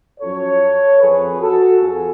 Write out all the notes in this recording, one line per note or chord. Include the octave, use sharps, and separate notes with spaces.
F#2 F3 A4 C#5
F2 F3 G#4 B4
F#4 A4
F2 F4 G#4